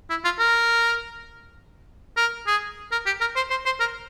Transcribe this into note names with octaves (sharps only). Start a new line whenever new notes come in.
E4
F4
A#4
A#4
G#4
A#4
G4
A#4
C5
C5
C5
A#4